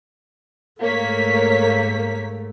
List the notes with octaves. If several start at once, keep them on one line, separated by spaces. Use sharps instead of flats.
G#2 A3 A#3 C#5 B6